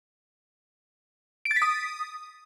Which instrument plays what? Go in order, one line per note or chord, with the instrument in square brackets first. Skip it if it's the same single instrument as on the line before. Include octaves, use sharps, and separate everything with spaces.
[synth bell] D7
A6
B6
D#6